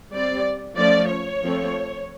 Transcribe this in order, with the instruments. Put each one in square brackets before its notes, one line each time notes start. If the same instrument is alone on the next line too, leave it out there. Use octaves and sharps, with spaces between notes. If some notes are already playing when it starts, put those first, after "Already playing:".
[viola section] G3 C4 D5
F3 A3 C#4 D5
C#5
F3 A3 C4